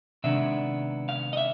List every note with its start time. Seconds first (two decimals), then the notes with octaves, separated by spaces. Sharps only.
0.24 C3 D#3 G#3 B3 D4 E5
1.09 F5
1.33 D#5
1.37 E5